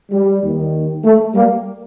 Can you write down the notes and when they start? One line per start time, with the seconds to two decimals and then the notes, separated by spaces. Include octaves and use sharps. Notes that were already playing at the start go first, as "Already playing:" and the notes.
0.12 G3
0.42 D#2 D#3
1.04 A3
1.35 G3 A#3